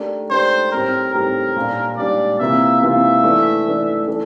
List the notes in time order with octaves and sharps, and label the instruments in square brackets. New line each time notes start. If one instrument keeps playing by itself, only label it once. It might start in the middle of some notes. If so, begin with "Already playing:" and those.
Already playing: [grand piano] A3 D4 G4 A#4 D5
[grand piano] A3 D4 G4 A#4 D5 [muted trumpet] C5
[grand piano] A2 G3 C4 G4 C5 [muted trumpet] A#4
[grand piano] A2 G3 C4 G4 C5 [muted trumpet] A#4
[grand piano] A#2 G3 D4
[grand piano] A#2 G3 D4 [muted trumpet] D5
[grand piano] C3 E3 A#3 F4 [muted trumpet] E5
[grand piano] C3 E3 A#3 F4 [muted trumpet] E5
[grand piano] E3 A3 D4
E3 A3 D4
E3 A3 D4 A4